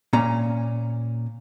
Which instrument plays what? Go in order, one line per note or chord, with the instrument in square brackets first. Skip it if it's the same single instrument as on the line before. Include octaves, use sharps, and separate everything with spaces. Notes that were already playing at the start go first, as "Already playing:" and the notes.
[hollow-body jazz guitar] A#2 C#4 A#5